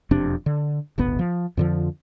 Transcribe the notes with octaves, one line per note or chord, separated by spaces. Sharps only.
E1 F2 C3 D4
D3
D1 G1 B3
F3
F2 D3 F3